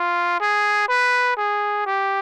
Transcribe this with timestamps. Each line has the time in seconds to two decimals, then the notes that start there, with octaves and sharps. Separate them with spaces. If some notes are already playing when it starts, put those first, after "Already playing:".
Already playing: F4
0.40 G#4
0.88 B4
1.37 G#4
1.86 G4